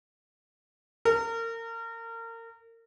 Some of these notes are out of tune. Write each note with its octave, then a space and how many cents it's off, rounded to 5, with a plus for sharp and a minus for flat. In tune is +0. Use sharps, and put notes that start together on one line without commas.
A#4 -30